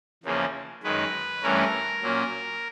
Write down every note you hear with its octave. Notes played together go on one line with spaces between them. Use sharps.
E2 C#3 F3 A#3 C#4
F#2 D#3 G#3 B4
G2 E3 A3 C#4 A#4
A#2 F#3 A#3 C#4